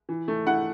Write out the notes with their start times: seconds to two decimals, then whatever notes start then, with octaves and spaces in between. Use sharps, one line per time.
0.09 E3
0.28 A3
0.46 E4 F#5